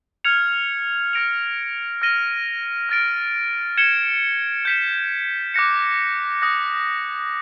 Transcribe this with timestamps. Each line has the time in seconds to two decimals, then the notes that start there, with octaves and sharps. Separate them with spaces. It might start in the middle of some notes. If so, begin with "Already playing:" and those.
0.25 F6 G#6 C#7 F7
1.13 F6 A#6 D7 F7
2.02 F6 A#6 D#7 G7
2.89 F6 A6 D7
3.77 G#6 C#7 E7 G7
4.65 G6 B6 E7
5.54 D6 F#6 A#6 C#7
6.42 D#6 F#6 A#6